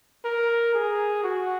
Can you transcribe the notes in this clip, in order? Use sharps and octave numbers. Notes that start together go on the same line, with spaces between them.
A#4
G#4
F#4